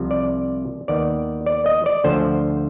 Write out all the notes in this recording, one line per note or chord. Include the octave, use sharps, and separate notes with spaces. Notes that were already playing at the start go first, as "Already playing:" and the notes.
Already playing: C2 C3 F3
D5
D#2 D#3 B3 D5
D5
D#5
D5
D2 D3 F3 C5